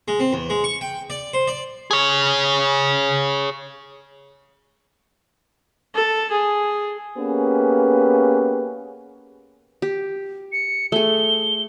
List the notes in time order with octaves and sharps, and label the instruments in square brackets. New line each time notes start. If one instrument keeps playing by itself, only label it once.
[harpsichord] G#3
C4
E2
G#3
C#6
G5
D5
C5
D5
[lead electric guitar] G#4 C#5
[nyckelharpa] A4
G#4
[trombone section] A#3 B3 C#4 G4 G#4 B4
[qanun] G4
[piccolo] C#7
[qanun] A3 G#4 [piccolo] G7